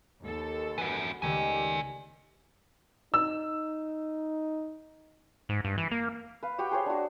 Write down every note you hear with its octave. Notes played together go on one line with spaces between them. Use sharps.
D#2 A4
E3 F#4 B4
C#2 D#3 A3 G4 D5 G#5
D#4 E6
G#2
G2
E3
A#3
B4 F5
F#4 G4 G5 C#6
G#4 C5 C#5 F5
D4 F#4